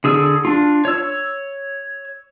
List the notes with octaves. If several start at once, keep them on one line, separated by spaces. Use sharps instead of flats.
D3 G#4 E6
D4 F4
C#5 E6